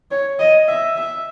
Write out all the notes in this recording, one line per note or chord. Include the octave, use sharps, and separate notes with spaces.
C#5
D#5
E5
E5